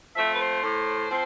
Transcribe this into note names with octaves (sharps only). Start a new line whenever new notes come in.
F3 A3 C4 E5
B4
C5
A2
F3 C4